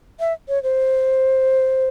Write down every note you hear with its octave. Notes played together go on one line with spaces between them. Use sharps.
E5
C#5
C5